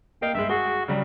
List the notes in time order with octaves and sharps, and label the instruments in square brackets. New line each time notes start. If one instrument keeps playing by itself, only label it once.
[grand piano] A#3 D#5 [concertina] F5 G5
[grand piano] G2 G#3 [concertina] E5
[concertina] F#4 [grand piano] G#4 G7
[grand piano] C#3 F#3 G3